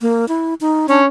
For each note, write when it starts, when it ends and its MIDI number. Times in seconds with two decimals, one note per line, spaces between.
0.01 0.28 58
0.28 0.54 64
0.61 0.87 63
0.89 1.06 61
0.89 1.01 62